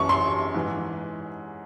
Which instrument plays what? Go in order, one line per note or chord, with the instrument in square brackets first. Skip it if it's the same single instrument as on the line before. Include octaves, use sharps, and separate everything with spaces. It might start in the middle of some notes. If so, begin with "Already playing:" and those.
Already playing: [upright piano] F#2 E3 C#6
C6
G#2 E3